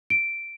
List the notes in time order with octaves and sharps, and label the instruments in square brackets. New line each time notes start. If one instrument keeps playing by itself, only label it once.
[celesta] D7